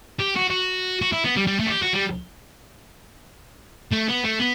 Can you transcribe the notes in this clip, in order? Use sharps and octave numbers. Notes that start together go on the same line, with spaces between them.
G4
F#4
F#4
F#4
E4
B3
G3
G3
A3
F#4
G4
F#4
G3
A3
B3
A3
B3